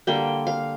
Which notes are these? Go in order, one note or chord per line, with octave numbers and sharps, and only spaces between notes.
D3 G3 A#3 G5
F5